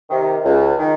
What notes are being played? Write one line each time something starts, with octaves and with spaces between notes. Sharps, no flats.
C3 D#3
C#2
D#3